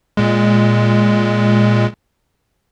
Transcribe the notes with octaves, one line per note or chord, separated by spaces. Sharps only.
A#2 G#3